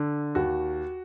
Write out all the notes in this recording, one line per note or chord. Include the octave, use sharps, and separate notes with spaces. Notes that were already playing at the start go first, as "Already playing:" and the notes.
Already playing: D3
D#2 F#4